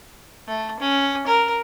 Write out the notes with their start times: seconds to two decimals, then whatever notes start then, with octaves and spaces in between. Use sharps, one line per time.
0.48 A3
0.80 C#4
1.27 A#4